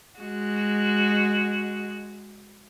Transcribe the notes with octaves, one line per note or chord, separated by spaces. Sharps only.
G#3 F#4